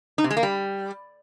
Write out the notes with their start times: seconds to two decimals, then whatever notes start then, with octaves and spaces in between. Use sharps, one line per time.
0.18 D#4
0.24 C3
0.30 G#3
0.37 A#3
0.43 G3